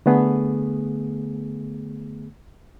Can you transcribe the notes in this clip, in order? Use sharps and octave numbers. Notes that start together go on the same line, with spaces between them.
D3 A3 B3 G#4